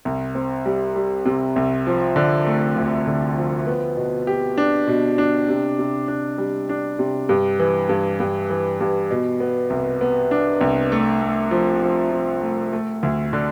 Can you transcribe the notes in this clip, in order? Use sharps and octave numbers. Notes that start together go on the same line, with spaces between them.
C2
C4
G3
G3
C3
C2
F3
D3
A3
D2
D3
F3
B3
B2
G4
D4
B2
D4
C3
C3
D4
G3
D4
C3
G2
E3
G2
G2
E3
G2
B2
B3
C2
B3
D4
C2
A3
A3
F3
F3
F3
A3
A3
D2
D3